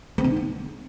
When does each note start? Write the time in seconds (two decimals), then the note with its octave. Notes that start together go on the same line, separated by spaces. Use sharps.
0.18 C4
0.24 D3
0.30 D#4
0.37 B3